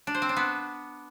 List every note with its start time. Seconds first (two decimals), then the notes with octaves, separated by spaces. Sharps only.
0.07 D4
0.15 C5
0.22 C4
0.29 D4
0.37 B3